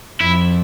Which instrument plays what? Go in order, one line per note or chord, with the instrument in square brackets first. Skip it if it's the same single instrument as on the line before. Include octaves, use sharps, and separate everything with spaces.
[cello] F2 [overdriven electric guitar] E4